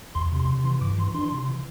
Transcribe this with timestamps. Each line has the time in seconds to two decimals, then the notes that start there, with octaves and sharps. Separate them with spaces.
0.15 E2 C6
0.32 C3
0.40 C6
0.49 C3
0.64 E3 C6
0.81 G2 D6
0.98 E3 C6
1.14 D4 C6
1.32 C3
1.48 E3